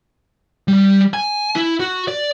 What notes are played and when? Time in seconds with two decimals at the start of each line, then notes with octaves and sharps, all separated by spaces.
0.68 G3
1.14 G#5
1.56 E4
1.80 F#4
2.08 D5